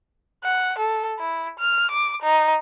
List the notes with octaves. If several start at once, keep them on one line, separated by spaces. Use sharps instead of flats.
F#5
A4
E4
F6
D6
D#4